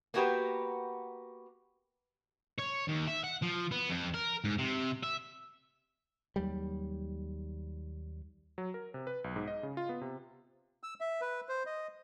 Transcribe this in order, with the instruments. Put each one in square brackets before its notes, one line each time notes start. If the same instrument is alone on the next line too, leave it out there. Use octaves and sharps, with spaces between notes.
[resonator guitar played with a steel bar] A#3 B3 F#4 G4 B4
[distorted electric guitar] C#5
D#2
E5
F#5
F3
B3
F2
A#4
G#2
C3
E5
[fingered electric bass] D#2 F#3 G3
[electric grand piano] F#3
A#4
C3
B4
B1
G#2
D#5
C#3
F4
B3
C3
[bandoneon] E6
E5
B4
C5
D#5